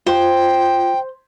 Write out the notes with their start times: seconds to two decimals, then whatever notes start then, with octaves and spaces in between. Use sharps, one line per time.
0.07 F4 C5 G5